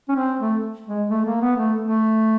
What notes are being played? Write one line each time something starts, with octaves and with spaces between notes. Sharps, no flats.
C#4
C4
A3
G#3
A3
A#3
B3
A3
A3